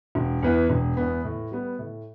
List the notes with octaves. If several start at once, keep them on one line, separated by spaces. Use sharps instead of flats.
E1
E2 E3 B3
E1
E2 E3 B3
A2
G3 B3
A2